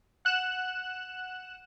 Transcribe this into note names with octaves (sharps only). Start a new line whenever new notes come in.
F#5 F#6 E7